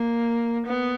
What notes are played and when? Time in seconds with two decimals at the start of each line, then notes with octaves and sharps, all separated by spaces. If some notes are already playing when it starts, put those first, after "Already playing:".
Already playing: A#3
0.67 B3